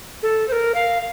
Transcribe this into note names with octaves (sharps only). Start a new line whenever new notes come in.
A4
C5
A#4
F5